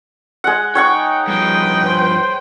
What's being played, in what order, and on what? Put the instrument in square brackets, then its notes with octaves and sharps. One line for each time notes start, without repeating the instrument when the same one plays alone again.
[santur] G#3 F#5
[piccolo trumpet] D#4 [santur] C#5 F#5 C#6 [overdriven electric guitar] G5
[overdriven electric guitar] G2 F3 [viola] B4 G5
[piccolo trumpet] C5